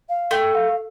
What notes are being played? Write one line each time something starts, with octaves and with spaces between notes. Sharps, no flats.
F5
A3 G5
F5